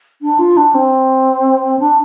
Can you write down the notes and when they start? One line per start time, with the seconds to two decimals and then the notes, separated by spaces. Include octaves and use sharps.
0.22 D4
0.39 F4
0.57 D4
0.74 C4
1.79 D4